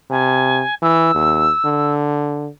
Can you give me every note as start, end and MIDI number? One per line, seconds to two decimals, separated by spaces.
0.10 0.62 48
0.10 0.74 80
0.82 1.11 52
0.82 1.92 88
1.15 1.50 39
1.65 2.49 50